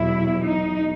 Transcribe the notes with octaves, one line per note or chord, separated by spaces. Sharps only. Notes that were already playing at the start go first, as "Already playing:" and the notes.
Already playing: E2 B2 F#3 E4
D#4